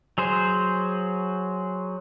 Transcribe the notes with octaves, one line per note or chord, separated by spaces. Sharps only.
F#3 G#4 C5